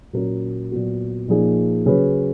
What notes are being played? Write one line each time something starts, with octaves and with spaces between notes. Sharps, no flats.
A#2 F#3 C#4 F#4 A#4
A#2 F#3 B3 F#4
A#2 F3 A#3 D#4 G#4
C#3 F#3 C#4 G#4 B4